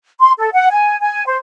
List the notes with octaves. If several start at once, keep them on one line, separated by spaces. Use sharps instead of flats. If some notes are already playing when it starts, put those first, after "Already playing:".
C6
A4
F#5
G#5
G#5
C5